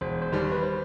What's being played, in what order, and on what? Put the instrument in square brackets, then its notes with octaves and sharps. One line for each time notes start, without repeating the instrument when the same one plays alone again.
[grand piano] E1 [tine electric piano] C5
[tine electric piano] C5
[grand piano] D#2 D#3 G3
[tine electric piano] B4
C5